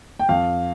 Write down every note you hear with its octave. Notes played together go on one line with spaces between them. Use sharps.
G5
F2 F5